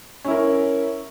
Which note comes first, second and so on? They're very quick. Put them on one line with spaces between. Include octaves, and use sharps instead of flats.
C#4 E4 A#4